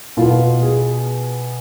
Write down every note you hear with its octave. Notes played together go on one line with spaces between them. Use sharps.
B2 B3 F4
G#4